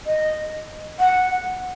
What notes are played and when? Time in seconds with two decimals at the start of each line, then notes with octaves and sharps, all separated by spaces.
0.06 D#5
1.00 F#5